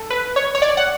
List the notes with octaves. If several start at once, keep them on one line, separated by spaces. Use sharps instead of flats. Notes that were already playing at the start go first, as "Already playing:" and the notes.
Already playing: A4
B4
C#5
C#5
D5
F#5